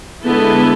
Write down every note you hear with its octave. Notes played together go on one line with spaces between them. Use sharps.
D3 G#3 B3 E4 A4